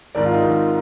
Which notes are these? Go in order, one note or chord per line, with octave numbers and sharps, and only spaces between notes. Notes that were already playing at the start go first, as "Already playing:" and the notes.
G#1 G#2 D#3 D5
F4
D#4
G#1 G#2 D#3